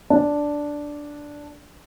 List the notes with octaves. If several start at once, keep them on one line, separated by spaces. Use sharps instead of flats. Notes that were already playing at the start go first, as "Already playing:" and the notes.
D4